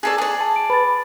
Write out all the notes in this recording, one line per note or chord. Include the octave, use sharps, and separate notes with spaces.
G#4 A4 D5
G#4 D5
A5
D7
B4 B5 A6